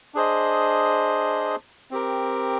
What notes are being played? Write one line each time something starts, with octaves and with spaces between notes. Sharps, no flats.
D4 G#4 C5 D#5
C4 G4 A#4